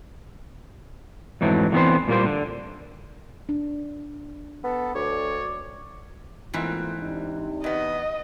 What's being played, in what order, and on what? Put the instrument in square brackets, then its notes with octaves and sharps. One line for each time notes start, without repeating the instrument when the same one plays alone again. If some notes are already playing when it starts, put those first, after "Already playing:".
[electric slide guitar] F2 G#2 E3 F#3 A3
D3 E3 B3 C4 B4 C5
A#2 G3 A#3 C5
D3
[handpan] D4
[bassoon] B3 [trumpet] A4
[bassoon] D2 [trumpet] C#5 [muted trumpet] D5
[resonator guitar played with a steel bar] G#2 E3 C4 [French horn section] A3 A#3 F4
[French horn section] C3 D4 D#4
[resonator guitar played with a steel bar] E2 B3 [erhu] D#5